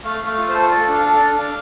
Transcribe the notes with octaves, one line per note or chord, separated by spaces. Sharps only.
A3 F5
A3
F5
F4
C5
A4
A4 D5
D4 F5
A4 F5
D5
D4
D4 F5